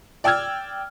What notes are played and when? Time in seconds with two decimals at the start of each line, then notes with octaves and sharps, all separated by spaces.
0.24 D5 G5 E6 F6 G#6